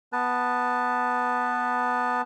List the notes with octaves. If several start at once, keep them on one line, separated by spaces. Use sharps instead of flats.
B3 B4 A5